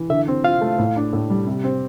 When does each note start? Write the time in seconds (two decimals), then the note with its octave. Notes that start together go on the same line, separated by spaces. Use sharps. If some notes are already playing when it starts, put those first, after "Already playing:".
Already playing: E3
0.10 D3 E5
0.28 C4
0.44 F4 F5
0.61 A3
0.79 A2
0.96 D4
1.13 A2
1.30 G3
1.47 C3
1.64 C4